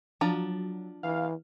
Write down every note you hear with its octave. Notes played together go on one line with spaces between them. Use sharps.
F3 F#3 D4 A#5
E3 F5